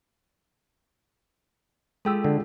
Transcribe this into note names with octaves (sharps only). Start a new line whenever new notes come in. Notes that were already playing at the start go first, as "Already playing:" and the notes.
G#3 F4 G#4 A4 G5 E6
D3